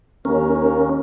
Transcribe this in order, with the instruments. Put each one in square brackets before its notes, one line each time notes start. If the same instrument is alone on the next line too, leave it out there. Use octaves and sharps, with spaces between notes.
[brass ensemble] D#2 [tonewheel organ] C#4 A#4